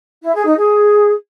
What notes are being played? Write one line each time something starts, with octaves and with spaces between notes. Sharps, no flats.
E4
G#4
D#4
G#4